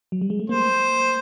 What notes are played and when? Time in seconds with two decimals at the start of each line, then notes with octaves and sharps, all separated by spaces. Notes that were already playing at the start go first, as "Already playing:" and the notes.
0.12 F#3
0.21 G3
0.30 G#3
0.40 A3
0.49 A#3 C5